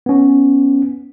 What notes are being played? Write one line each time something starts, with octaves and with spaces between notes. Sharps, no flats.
B3 C#4